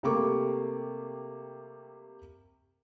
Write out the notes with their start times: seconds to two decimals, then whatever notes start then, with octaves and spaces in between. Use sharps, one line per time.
0.03 C3 G3 A3 A#3 C#6 D6